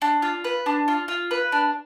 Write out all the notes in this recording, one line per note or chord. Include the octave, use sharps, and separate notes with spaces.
D4
F4
B4
D4
F4
F4
B4
D4